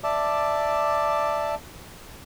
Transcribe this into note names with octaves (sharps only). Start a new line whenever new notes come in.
D5 E5 A5 D6